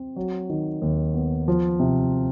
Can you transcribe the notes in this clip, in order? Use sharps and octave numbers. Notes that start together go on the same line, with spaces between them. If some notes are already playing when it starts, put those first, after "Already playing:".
Already playing: C4
F#3
D#3
D#2
B3
F3
C3